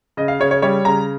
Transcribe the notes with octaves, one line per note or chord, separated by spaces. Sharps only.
C#3 D#5
F5
C#3 C#5
C#5
G3 C#5
C#3 A#5